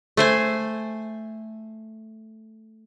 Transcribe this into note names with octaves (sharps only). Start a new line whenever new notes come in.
A3 C5 G#5